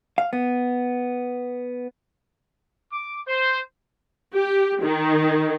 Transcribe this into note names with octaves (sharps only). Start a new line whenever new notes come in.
F5
B3
D6
C5
G4
D#3